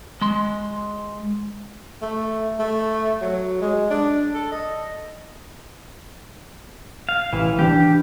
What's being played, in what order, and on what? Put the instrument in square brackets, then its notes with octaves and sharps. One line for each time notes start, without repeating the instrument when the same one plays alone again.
[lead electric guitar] G#3 C6
[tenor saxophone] A3
A3
F#3
G#3
D4
A4
D#5
[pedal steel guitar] F5
[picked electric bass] A1 [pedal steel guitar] E3
[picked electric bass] E3 C4 D4 [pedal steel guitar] G4